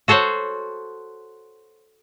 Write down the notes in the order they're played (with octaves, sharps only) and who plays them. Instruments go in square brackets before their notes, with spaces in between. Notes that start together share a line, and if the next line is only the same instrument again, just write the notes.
[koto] F#4 A4 C5 C#5 F#5